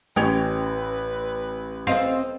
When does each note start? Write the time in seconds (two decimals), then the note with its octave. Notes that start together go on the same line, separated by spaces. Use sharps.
0.16 A1 C#4 B4 C#5 G5
1.87 C4 A4 D#5 F5